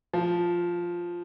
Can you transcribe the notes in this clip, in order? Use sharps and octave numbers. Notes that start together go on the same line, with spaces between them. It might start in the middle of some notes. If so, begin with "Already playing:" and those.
F3